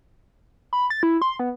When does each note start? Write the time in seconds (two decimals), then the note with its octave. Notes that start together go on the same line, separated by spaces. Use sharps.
0.73 B5
0.90 A6
1.03 E4
1.22 C6
1.39 B3